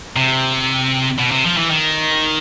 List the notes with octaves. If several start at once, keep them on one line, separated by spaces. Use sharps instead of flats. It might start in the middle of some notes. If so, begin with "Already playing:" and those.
C3
B2
C3
F3
E3
D#3